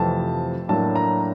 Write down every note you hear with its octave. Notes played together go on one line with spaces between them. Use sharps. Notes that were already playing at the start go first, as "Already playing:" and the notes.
Already playing: F2 C3 E3 A3 C4 A5
A2 F#3 A#3 D4 A5
A#5